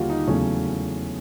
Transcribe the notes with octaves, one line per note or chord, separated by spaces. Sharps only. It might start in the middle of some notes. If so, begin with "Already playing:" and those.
Already playing: D#2 D3 G3 F4 F#4
D#4
E2 C#3 F#3 A3 C#4